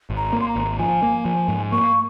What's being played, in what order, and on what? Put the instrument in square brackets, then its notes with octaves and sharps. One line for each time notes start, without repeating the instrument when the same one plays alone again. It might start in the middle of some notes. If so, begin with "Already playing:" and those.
[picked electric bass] G#1
[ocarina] A#5
[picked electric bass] A#3
[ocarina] C6
A#5
[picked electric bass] G#1
[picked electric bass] F3 [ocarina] G#5
[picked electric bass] A#3
F3
G#2
[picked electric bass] A#3 [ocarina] C#6